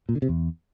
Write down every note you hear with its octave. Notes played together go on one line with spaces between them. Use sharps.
A#2
D3
C3
E2